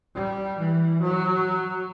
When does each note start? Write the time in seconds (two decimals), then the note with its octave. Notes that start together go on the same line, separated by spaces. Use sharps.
0.15 G3
0.58 E3
1.02 F#3